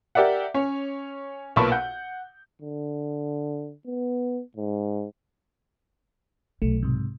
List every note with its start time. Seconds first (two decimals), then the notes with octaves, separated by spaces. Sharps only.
0.15 G4 A#4 D5 E5 F#5
0.54 C#4 C#5
1.56 B1 A#2 B3 A5 B5 C#6
1.72 F#5 G6
2.62 D3
3.86 B3
4.57 G#2
6.62 B1 A3
6.83 G#2 C3